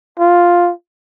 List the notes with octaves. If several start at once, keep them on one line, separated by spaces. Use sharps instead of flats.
F4